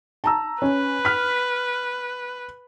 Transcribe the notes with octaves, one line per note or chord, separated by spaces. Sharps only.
A5 A#5 E6
C#4 B4
F6 B6